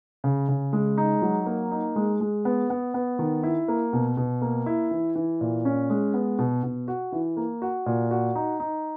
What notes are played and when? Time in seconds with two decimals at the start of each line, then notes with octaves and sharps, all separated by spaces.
0.24 C#3
0.48 C#3
0.73 G#3
0.98 D#4
1.22 F#3
1.47 A#3
1.71 D#4
1.96 G#3
2.21 G#3
2.45 B3
2.70 B3
2.94 B3
3.19 D#3
3.43 E4
3.68 A#3
3.93 B2
4.17 B2
4.41 A#3
4.66 E4
4.91 E3
5.15 E3
5.41 A#2
5.65 C#4
5.90 G#3
6.14 B3
6.39 B2
6.63 B2
6.88 F#4
7.12 E3
7.37 A#3
7.62 F#4
7.86 A#2
8.11 F#4
8.35 D#4
8.60 D#4